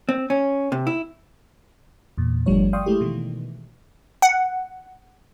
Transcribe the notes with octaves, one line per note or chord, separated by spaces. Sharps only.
C4
C#4
C3
E4
E2 A#2
G1 F3 G3 A3 D4 C#5
D5 F5 G5 C6 C#6 D#6
G#3 A3 E4 G4
B2 D#3 E3 G#3 A3
F#5